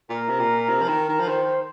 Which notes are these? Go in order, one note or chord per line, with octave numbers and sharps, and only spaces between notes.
A#2 A#4
C3
A#2
C3
F3
D#3
D#3
F3
D#3 C5